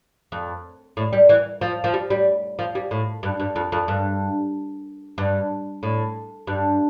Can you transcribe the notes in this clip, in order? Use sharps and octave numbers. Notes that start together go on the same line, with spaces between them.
F2
A2
G3
E3
F3
F3
G3
G3
F3
G3
A2
G2
G2
F2
F2
G2
G2
A2
G2